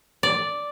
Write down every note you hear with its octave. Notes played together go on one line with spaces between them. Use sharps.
D5